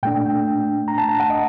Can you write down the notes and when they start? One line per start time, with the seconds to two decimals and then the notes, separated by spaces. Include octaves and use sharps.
0.03 A#2 A3 D4 G5
0.88 A#5
0.98 A5
1.09 A#5
1.20 F#5
1.30 D#5